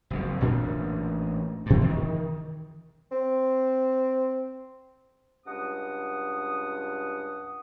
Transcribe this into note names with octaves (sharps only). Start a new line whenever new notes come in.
F#1 F2
A1 A#2 D4
G2 B2
D#3 E3
C4
C#2 G2 F#5 D#6